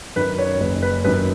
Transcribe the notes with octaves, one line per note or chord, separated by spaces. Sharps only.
F#2 D#3 B4
C#5
F#1 B4
B4
F#2 D#3 B4